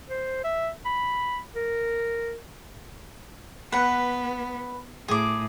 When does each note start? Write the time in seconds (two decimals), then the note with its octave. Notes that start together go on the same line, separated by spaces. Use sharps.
0.10 C5
0.44 E5
0.85 B5
1.55 A#4
3.72 B3 B4 F#5
5.08 A2 G#4 D6